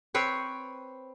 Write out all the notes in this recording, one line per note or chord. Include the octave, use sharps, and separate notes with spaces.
C4 B4 C#5